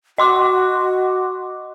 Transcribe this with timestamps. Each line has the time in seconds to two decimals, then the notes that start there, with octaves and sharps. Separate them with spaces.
0.18 F#4 D#5 C6 D6